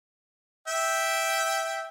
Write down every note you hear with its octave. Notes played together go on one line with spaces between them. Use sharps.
E5 G5